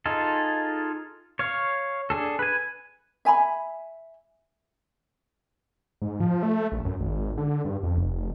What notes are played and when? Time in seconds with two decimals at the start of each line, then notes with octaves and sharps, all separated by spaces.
0.06 D#4 F4 G#4 A4
1.39 C#5 F5
2.10 D4 G#4 A4
2.39 B4 G#5
3.25 E5 G#5 A#5 B5
6.02 G#2
6.20 F3
6.43 A3
6.72 A#1
6.85 F#2
7.00 G#1
7.38 D3
7.65 G2
7.83 F2
7.98 F1